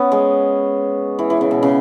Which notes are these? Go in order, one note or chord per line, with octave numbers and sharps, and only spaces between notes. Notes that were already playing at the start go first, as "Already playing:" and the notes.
Already playing: B3 C#4
G#3
E3
E3
C#3
B2
C#3